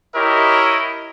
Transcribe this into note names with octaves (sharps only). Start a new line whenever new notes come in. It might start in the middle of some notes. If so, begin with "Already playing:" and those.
E4 G4 A#4 C#5 D#5